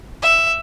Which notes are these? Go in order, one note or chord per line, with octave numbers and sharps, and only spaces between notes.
E5